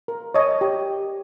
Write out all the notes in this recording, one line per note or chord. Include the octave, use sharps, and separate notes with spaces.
A#4
C#5 D#5
G4